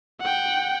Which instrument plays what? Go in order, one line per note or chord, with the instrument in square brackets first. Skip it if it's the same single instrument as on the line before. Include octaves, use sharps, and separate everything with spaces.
[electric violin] F#5 G5